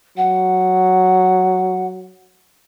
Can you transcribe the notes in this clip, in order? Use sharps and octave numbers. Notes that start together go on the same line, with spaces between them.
F#3 F#5